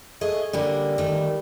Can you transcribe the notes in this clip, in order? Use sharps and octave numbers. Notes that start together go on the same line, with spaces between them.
A3 G#4 D#5
D3 G3 A#3 C#4
D#3 A3